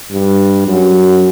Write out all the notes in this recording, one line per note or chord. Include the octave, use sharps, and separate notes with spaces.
G2
F#2